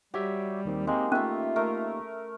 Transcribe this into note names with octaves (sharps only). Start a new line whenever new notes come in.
G3 F#4 G4 C#5 E5
D#2 D#3 C4
G#3 A#3 C4 D#4 G4
A3 C#4 F4 E5
A3 A#4